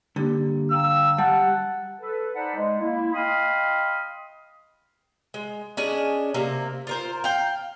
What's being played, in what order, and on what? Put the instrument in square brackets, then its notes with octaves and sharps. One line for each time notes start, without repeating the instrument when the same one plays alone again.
[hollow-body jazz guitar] G2 D3 [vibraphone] A#3 G4
[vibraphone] F5 G5 A#5 [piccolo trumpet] E6
[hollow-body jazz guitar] G3 [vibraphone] G4 [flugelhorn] F#5 [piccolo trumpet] A5
[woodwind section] A4 B4
D#4 C5 D5 F#5 A5 B5
G#3
A#3 E4
D#5 F5 G5 B5 C6 D#6
[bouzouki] G#3
C#4 D4 G#4 D#5
C3 A#3
F4 A#4 C5
F5 G5